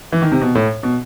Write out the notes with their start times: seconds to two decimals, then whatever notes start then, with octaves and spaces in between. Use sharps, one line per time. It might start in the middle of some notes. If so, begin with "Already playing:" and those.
0.12 E3
0.22 D#3
0.32 C3
0.41 B2
0.55 A2
0.83 B2